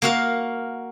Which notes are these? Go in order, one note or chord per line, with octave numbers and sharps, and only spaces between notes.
A#3 F#4 F5